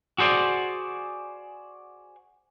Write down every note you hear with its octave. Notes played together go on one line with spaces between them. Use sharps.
F#4 G#4 C5 D5